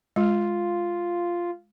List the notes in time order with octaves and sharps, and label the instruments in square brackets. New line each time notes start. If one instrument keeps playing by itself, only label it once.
[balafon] G#3 [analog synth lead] F4